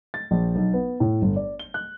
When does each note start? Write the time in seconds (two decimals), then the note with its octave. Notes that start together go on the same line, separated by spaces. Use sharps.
0.14 A6
0.31 A#1
0.55 B1
0.73 B3
1.00 A2
1.22 G1
1.36 D5
1.59 G7
1.74 F#6